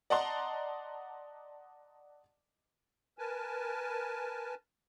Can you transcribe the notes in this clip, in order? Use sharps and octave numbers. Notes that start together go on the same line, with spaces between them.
D5 D#5 F#5 A5 A#5 C6
A#4 B4 G#5 A5